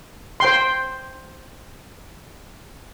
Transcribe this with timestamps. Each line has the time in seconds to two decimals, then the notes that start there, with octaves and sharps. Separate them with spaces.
0.40 C5 G5 C6